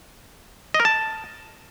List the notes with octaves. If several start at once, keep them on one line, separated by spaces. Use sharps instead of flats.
D#5
A#4
A5